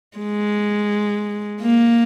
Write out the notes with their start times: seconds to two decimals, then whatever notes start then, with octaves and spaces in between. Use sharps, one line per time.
0.17 G#3
1.61 A#3